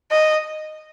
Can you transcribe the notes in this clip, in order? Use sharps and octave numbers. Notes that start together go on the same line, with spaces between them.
D#5